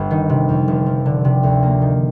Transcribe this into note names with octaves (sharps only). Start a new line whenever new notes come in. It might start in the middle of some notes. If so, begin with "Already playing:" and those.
Already playing: G1
D#3
C3
F2
F1
F3
D3
C3
D2
A#3
D#3